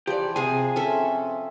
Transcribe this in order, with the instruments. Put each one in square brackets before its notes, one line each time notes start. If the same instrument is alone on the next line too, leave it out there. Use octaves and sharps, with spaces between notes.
[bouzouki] E3 D5 [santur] F3 [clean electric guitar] G4
[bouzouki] C3 C4 [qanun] G#4 [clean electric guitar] G#5
[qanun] C#4 A4 E5